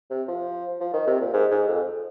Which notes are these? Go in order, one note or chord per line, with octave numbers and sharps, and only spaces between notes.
C3
F3
F3
D#3
C3
A#2
G#2
G#2
F2